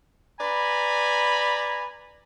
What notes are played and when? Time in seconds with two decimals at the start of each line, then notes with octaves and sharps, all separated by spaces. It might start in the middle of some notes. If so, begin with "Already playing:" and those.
0.40 B4 D5 G#5 A#5 B5